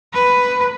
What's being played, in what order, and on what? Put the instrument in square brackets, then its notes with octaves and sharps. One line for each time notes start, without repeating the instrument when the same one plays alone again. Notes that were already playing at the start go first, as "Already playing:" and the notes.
[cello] B4